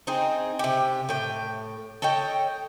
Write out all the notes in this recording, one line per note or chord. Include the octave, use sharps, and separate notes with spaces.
C4 D#4 G#4
C3 G4
A2 G5
A4 C#5 D#5 G5